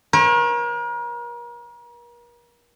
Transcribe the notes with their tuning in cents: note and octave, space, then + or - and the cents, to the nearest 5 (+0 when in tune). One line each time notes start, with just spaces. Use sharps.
A#4 +40 C#5 -45